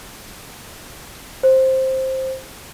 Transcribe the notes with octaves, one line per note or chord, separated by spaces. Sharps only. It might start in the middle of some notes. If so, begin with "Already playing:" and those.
C5